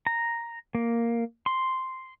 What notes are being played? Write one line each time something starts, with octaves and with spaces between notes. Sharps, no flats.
A#5
A#3
C6